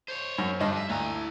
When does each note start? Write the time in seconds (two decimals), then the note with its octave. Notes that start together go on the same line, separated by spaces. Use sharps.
0.08 C5 C#5
0.38 F#2
0.60 D2 G2 F3 D#5
0.76 E5
0.89 D2 E4 A#5